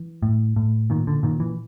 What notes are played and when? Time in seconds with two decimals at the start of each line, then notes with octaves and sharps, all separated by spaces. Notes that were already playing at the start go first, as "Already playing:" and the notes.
Already playing: E3
0.23 A2
0.56 A2
0.90 A#2 D#3
1.07 D3
1.23 A#2 D#3
1.40 E3